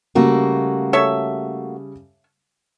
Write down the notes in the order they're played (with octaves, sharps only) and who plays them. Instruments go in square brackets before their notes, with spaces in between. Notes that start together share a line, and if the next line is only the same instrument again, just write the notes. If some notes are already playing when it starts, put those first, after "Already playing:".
[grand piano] C#3 G3 [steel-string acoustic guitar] A3 A#3 F#4
[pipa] A4 C#5 E5